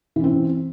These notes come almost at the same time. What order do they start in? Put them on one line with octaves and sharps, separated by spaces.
E3 C#4 C4